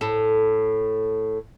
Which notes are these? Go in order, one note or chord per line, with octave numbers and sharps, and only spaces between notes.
A2 A4